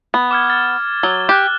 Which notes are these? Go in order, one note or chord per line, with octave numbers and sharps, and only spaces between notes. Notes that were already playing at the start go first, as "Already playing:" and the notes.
B3
D6 F6 G#6
F6 A6
F#3 G7
G4 D6 F#6